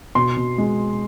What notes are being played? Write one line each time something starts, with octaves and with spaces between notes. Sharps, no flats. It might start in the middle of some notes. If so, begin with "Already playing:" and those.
B2 C6
B2
G#3